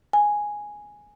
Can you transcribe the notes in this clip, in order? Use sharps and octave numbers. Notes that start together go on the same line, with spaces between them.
G#5